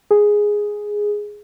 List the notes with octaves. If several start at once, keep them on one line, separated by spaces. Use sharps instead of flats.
G#4